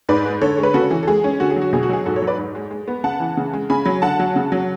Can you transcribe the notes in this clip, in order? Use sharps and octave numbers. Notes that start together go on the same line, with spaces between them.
G#2 B4 D5
G#3
D3 A4 C#5
G#3
B4
C#3 F#4 A4
E3
A4
G#3 G#4
C#4
D3 F#4
G#4
F#3
F#4
B2 G#4
F#4
F#3 G#4
G#2 F#4 A4
A4 C#5
F#3
B4 D5
G#2
G#3
G#3
B3
C#3 F#5 A5
E3
C#3
G#3
C#3 G#5 B5
F#3
D3 F#5 A5
F#3
C#3
F#3